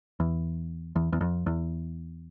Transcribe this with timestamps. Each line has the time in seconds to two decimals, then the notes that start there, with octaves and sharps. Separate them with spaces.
0.20 E2
0.96 E2
1.13 E2
1.21 F2
1.46 E2